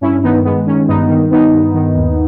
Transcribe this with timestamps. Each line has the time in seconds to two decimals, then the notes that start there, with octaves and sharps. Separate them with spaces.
0.01 G2 C#4 E4
0.23 D#3 B3 D#4
0.45 G#3 B3
0.66 D#3 C#4
0.88 G2 B3 D#4
1.09 D#3
1.31 G2 B3 D#4
1.53 G2
1.74 D#3
1.96 D#2